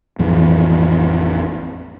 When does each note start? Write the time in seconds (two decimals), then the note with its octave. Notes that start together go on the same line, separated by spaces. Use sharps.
0.19 A1 F2 E3